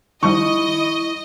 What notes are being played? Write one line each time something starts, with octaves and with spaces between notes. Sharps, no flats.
D#3 F3 G3 E4 D#5 C#6